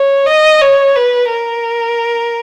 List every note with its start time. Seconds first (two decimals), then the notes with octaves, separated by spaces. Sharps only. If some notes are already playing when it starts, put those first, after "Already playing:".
Already playing: C#5
0.26 D#5
0.61 C#5
0.96 B4
1.30 A#4